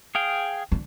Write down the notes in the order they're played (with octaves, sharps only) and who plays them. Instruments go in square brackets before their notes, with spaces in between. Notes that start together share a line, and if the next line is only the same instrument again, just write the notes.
[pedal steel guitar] G#4 F5 G5
[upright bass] D3